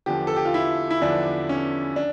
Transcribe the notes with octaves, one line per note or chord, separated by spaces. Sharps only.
E2 D3 F3 G4
A4
G4
F4
E4
E4
E2 D3 F3 D4
C#4
D4